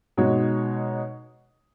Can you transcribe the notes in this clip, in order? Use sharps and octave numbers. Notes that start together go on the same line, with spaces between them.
B2 G#3 D#4 F#4 C#5